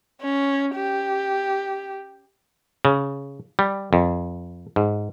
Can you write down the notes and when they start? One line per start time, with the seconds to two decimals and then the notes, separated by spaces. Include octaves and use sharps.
0.22 C#4
0.76 G4
2.85 C#3
3.59 G3
3.93 F2
4.76 G#2